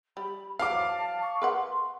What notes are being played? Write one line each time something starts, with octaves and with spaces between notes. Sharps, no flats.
G3 B5
E3 F#3 C5 F5 A5 D6
C#6
A#4 B4 F#5 C6